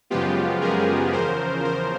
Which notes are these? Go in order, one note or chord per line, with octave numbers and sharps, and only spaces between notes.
F#2 C#3 F3 G#3 B3 F4 G4
G#4 A#4
E2 C#3 F3 A#4 C5
A#4 C5